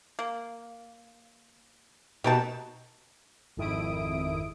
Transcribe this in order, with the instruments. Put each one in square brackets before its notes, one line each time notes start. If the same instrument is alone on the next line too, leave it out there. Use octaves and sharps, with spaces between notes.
[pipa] A#3
[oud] B2 D#4 [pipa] G4 A#4 A5
[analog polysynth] G#1 F2 D#3 E4 D#6 D7